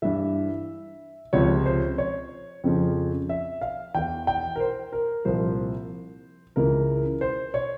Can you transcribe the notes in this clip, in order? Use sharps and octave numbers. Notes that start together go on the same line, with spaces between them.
G2 E3 E5
C#2 C3 F3 C#5
C5
C#5
F2 C#3 F3
E5
F5
E2 E3 G5
G5
A#4
C5
A#4
C2 A#2 F3 C5
C#2 C#3 E3 A#4
C5
C#5